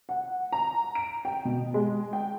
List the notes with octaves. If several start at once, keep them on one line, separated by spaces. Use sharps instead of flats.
F#5
A#5
D7
G5
B2
G#3
G5